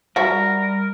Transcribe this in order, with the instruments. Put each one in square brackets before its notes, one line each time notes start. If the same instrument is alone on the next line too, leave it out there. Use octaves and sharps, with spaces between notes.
[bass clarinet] G3 [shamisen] F#4 E5 F#5 [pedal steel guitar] A#4